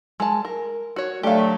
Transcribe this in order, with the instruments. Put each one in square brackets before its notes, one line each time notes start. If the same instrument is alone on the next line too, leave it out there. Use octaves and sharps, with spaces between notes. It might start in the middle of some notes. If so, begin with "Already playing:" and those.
[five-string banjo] G#3 A5
A#4
F#4 C#5
[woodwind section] D3 F#3 A3 [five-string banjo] G4 F5